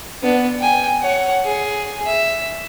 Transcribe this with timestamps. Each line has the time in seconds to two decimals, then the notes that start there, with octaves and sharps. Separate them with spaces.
0.23 B3 D4
0.58 G5 G#5
1.02 C#5 F#5
1.45 G#4
2.05 E5